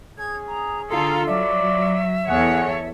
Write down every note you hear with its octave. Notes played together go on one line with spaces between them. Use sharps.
C#4 G#4 G#6
A#5
D3 F4 A4 A#5
F#3 F4 D5 E5
E2 G#4 A4 C#5 F#5